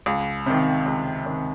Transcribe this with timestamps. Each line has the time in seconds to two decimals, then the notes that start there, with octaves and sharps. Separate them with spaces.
0.06 C#2
0.46 C3 D#3
0.86 C#2
1.26 C3 D#3